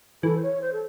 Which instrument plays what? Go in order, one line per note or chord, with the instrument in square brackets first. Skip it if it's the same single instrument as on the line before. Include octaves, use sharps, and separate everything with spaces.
[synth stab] E3 [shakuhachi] A4
[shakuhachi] C5
C#5
C5
A4